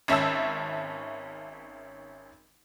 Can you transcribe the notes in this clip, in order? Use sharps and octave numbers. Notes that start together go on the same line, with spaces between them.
G#1 C#4 E5 A5 E6